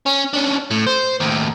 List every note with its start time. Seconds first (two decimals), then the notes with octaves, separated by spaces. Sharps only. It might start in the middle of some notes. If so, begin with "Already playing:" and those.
0.06 C#4
0.33 C#4 D4
0.71 A2
0.86 C5
1.20 D#2 A2